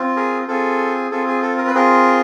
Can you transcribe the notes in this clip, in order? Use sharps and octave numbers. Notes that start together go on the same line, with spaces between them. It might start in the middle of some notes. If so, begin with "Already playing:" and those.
Already playing: C4 F4
G#4 A#4
C4 F4 G#4 A4
C4 F4 G#4 A4
G#4
A4
A#4
B4
C4 F4 G#4 A#4